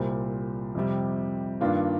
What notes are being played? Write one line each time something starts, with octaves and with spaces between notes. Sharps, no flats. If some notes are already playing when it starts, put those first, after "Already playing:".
Already playing: C2 A#2 G3 C4
F2 C3 G3
G2 D#3 A#3 D4 F4